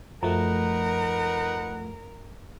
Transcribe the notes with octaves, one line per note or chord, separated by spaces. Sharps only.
F#2 F3 A3 D#4 A#4 B4 F#5